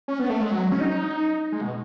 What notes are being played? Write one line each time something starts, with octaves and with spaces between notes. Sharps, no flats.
C#4
B3
A3
G#3
F#3
C#4
D#4
G#3
B2